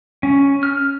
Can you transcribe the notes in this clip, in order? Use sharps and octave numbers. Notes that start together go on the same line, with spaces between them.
C#4
F6